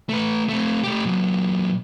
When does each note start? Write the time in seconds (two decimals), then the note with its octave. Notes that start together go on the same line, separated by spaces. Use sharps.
0.09 A3 B4
0.49 A3 C4
0.84 A3 G4
1.04 A#2 F#3